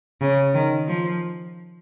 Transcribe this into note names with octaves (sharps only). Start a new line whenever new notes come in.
C#3
D#3
F3